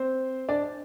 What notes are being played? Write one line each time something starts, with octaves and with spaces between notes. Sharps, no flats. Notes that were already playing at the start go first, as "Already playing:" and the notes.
Already playing: C4 C5
D4 D5